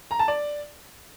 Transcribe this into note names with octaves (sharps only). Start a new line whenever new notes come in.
A#5
A5
D5